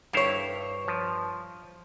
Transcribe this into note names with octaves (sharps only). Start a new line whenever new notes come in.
G2 E4 C5 C#5 F5
F3